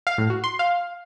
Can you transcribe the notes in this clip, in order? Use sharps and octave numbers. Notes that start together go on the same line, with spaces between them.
F5
A2
F#4
C6
F5